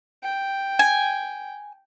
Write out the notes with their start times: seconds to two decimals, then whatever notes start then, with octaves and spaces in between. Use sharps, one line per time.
0.23 G5
0.79 G#5